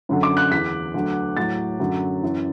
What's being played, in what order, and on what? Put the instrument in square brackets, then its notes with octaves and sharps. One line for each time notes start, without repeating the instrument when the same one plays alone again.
[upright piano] F#2 D3 F#3
D6
F#6
E2 E3 B6
D2 D3 F#3
A2 F#3 A6
F#2 D3 F#3
F#2 E3